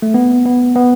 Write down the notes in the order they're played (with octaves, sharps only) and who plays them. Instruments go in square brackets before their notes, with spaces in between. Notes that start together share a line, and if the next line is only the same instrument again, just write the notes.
[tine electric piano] A3
B3
B3
B3